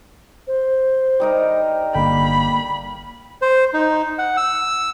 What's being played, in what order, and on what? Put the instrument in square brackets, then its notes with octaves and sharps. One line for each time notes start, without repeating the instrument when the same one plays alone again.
[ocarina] C5
[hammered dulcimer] G3 D#4 A#4
[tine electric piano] G1 D3 G5 [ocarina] A#3 [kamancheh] B5
[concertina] C5
D#4
F#5
E6